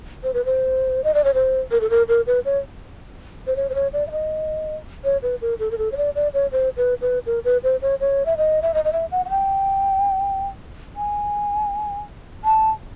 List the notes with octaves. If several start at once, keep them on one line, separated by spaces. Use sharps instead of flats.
C5
B4
C5
D#5
D5
C#5
C5
A#4
A4
A#4
A#4
B4
C#5
C5
C#5
C5
C#5
D5
E5
D#5
C#5
B4
A#4
A4
A#4
A4
C#5
D5
D5
C#5
C5
B4
B4
A#4
B4
C5
C#5
C#5
E5
D#5
E5
D#5
D#5
E5
F#5
F#5
G5
G#5
A5